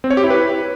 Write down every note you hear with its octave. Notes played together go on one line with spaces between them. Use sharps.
C4
C#5
G4
E4
B4